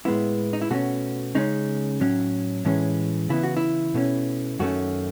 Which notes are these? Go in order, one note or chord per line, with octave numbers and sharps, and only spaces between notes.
A2 G#3 B3 E4
D#4
E4
B2 A3 C#4 F#4
C#3 G#3 C#4 D#4
A2 F#3 C#4
A2 E3 G#3 C#4
C#3 E3 B3 E4
F#4
E4
B2 A3 C#4
F#2 D#3 A3 C#4 F#4